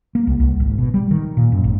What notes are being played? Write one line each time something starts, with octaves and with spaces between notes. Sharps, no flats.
A#3
C2
C2
G#1
B2
G3
D#3
A#2
F#2
G#1